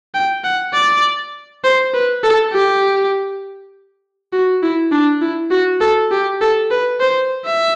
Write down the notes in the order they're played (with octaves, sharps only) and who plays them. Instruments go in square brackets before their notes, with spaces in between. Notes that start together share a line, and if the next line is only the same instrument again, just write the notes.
[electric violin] G5
F#5
D5
C5
B4
A4
G4
F#4
E4
D4
E4
F#4
A4
G4
A4
B4
C5
E5